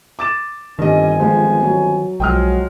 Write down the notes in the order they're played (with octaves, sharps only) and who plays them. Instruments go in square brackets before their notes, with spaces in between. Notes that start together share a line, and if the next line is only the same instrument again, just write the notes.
[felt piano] D6 A6 E7
[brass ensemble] G1 C4 G#5 [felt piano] G2 G3 D#5 [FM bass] D#3
[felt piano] F3 G#3
F#3
[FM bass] B1 [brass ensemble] F3 F#3 G#3 [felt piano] G5 D#6 F6